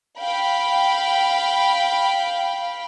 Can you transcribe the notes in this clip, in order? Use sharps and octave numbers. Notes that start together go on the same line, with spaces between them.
F5 G5 B5